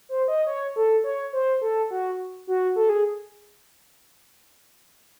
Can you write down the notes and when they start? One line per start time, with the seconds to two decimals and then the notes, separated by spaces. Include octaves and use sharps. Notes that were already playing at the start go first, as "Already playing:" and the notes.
0.09 C5
0.28 D#5
0.47 C#5
0.76 A4
1.04 C#5
1.33 C5
1.62 A4
1.91 F#4
2.47 F#4
2.76 A4
2.89 G#4